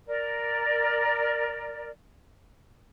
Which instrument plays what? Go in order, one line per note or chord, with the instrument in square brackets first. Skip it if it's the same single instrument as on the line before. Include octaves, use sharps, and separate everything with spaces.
[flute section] A#4 D5